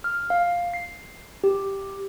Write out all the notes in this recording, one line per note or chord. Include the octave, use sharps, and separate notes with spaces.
F6
F5
C7
G4